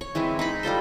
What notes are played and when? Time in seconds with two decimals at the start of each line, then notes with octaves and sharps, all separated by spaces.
0.01 C#5
0.15 E3 G#3 C4 E4
0.39 D#4 B5
0.63 G3 F4 A4 C5